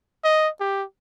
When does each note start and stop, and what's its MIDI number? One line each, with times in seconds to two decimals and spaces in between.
0.24 0.49 75
0.60 0.84 67